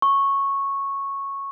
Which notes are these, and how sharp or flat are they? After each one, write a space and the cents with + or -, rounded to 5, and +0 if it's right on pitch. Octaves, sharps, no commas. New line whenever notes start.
C#6 -10